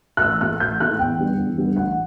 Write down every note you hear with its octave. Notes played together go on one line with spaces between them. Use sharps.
F#6
A1 E6
A2 E3 A3 F#6
A1 G6
A2 E3 A3 F#6
E2 G5
D3 G3 B3 D4
E2
D3 G3 B3 D4
A1 F#5